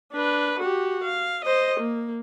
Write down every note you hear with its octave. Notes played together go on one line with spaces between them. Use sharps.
D4 B4
F#4 G4
F5
C5 D#5
A#3